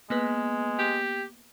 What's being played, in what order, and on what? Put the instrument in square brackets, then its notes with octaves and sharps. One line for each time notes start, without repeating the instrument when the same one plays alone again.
[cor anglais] G#3 [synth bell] A#3 B3 B4
[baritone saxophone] G4